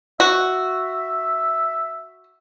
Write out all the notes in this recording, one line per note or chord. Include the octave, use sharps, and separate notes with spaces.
F#4 E5